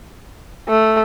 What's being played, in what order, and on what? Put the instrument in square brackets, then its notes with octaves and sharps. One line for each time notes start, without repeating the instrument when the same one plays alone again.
[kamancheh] A3